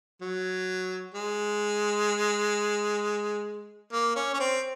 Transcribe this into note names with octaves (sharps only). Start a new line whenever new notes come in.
F#3
G#3
A#3
C#4
C#4
C4